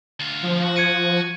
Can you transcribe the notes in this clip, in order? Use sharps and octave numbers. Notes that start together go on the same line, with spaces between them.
D2 F4
F3
F#4
F#4 G#6 C#7 D#7